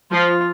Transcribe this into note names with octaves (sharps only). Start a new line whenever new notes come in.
F3 F4